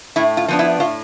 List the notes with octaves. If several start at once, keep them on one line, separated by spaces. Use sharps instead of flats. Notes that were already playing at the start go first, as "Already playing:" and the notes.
A2 E4
F4
F3 B3 D4
E4
A2 F4